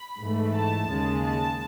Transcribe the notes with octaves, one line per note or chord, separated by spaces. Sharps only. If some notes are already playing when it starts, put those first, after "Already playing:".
Already playing: B5
G#2 E3 A3
A5
D#2 C#3 G#3
A5